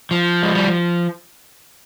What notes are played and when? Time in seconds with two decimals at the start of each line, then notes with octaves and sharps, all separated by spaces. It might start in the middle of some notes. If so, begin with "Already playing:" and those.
0.11 F3
0.43 G#3
0.55 G3
0.67 F3